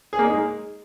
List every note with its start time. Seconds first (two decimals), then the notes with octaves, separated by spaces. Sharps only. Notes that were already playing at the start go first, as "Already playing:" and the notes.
0.13 G#4
0.19 A#3
0.25 D#4
0.31 G#3